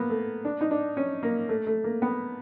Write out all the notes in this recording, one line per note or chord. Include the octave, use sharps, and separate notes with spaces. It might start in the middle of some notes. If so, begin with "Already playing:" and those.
Already playing: A#3 B3
A3
D4
D#4
D4
C#4
A#3
A3
A3
A#3
B3